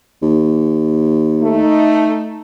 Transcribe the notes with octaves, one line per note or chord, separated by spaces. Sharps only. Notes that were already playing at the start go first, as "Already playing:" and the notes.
D#2
A3 D#4